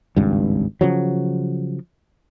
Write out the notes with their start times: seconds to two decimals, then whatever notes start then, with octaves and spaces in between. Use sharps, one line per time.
0.16 G#1 C#2 G2
0.81 C#3 F3 F#3